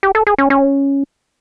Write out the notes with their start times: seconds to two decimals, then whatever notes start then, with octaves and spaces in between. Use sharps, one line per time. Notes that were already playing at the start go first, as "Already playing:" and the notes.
0.03 G4
0.15 A4
0.27 G#4
0.38 C#4
0.50 C#4